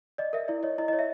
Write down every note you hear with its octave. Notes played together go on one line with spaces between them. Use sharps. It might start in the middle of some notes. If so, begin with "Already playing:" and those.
D5 D#5
A#4 E5
E4 D5
C#5 D#5
E4 D#5
C#5 D#5
E5